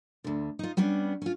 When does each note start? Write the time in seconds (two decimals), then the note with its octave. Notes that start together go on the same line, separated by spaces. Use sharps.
0.24 D2 D3
0.59 D#4 F4
0.77 G3 B3 C#4 D4
1.22 C#4 F4